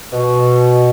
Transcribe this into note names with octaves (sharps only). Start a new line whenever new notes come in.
B2